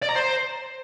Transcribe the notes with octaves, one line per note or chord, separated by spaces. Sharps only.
D5
A#5
C5